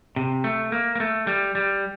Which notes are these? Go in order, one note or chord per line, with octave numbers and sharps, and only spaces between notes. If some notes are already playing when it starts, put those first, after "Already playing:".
C3
A3
A#3
A#3
A3
G3
G3